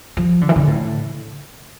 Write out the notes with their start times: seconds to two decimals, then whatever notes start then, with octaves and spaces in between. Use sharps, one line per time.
0.17 F3
0.41 D3
0.49 E3
0.56 D3
0.67 A2